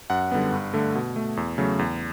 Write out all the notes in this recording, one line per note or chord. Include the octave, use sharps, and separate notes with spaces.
F#2 F#5
D3 G3 B3
G2
D3 A3
B2
A3
E2
C#3 F#3 A3
E2